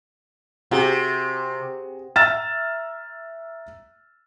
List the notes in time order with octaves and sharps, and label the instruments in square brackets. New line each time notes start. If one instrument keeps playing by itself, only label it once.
[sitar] C3 [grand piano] F#4 G#4
[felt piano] E5 A#5 E6 F6 A6 E7